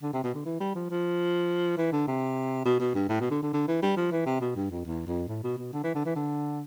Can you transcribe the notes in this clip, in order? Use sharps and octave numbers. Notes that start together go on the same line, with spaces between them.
D3
C3
B2
D3
E3
G3
F3
F3
E3
D3
C3
B2
B2
G2
A2
B2
D3
D3
D3
E3
G3
F3
E3
C3
B2
G2
F2
E2
F2
A2
B2
B2
D3
E3
D3
E3
D3